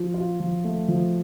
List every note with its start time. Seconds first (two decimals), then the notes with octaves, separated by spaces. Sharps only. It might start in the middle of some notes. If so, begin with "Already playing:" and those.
Already playing: F3 F4
0.14 F4
0.40 F3
0.64 A3
0.88 F3